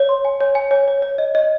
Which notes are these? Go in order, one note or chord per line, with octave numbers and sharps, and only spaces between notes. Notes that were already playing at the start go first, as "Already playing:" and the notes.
Already playing: C#5
C6
G#5
C#5
G#5
C#5
C#5
C#5
D#5
D#5